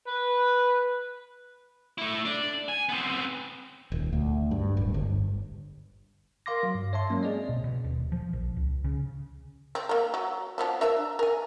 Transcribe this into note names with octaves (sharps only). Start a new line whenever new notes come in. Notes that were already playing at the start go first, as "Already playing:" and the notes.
B4
A3 E4
D4
G#5
B3 C4
D#1
D2
G2
D1
G1
A#4 F5 C6 D6 A#6
F#3
G2
C#5 E5 A5 C6
F#3 G#3 A#3 C#4
C4 G#4 D5 D#5
B2
B2
D#1
F3
A#1
C#2
C#3
C4
A#3 A#4
F#3
F3 B3 D4
D4 A#4 E5
A#4 G#5